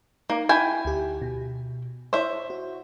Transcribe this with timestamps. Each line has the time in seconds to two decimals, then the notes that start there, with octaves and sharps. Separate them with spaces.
0.30 A#3 D#4
0.49 E4 G5 G#5
0.85 D2 G4
1.22 B2
2.13 E4 C5 C#5 E5
2.50 F#4